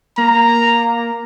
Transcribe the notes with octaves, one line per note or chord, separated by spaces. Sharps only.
A#3 A#5